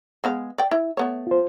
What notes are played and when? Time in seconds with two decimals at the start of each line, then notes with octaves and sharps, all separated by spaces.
0.24 G#3 B3 F5
0.58 D5 G5
0.71 E4
0.97 A3 B3 C#5
1.27 F4 C5